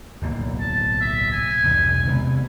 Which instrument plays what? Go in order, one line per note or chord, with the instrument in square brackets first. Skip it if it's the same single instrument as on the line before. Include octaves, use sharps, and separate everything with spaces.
[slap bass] D1 B1 A#3
[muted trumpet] A5
E5
G#5
[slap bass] B1 E2 G2
C3 G#3 B3